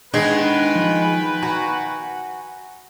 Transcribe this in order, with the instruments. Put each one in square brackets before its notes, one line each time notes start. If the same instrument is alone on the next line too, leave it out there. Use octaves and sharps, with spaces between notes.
[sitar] D#3 B3 [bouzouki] G#3 [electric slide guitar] D4 [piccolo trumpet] B4
[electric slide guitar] F3
[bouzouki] F#4 [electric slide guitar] G#5 A#5